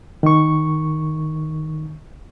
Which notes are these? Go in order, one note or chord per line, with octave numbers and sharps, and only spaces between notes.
D#3 C#6